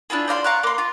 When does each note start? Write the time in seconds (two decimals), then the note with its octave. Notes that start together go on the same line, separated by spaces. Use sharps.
0.10 D4 E4 F4 G#4
0.28 C5 D5 F5 C6
0.44 F5 A#5 C#6 F#6
0.63 A#3 C6
0.78 F4